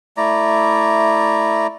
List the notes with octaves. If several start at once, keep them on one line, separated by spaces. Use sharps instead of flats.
A3 E4 D5 A#5